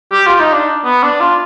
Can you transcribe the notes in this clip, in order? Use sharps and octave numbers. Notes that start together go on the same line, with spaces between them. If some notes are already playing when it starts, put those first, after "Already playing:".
G4
F4
D#4
D4
B3
D4
F4